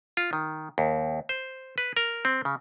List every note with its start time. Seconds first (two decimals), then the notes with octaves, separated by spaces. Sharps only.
0.17 F4
0.33 D#3
0.78 D#2
1.29 C5
1.78 B4
1.97 A#4
2.25 C4
2.45 C#3